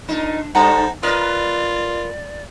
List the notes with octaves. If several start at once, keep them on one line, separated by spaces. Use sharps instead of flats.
A#2 D4 D#4
G2 G3 D#4 A4 C5 F#5 G#5 A#5
F4 A#4 B4 D5 D#5